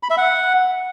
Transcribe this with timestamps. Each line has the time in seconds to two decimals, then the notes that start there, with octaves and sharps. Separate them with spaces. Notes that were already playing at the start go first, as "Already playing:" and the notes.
0.03 B5
0.10 E5
0.18 F#5